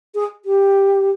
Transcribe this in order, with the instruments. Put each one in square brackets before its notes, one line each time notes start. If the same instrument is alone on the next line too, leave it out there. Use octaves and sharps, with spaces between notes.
[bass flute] G#4
G4